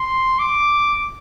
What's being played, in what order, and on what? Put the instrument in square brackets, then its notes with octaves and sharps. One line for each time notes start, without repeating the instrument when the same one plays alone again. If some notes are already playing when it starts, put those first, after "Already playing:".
Already playing: [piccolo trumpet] C6
D6